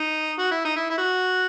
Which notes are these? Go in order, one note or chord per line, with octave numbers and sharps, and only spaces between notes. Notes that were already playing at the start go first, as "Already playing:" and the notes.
Already playing: D#4
F#4
E4
D#4
E4
E4
F#4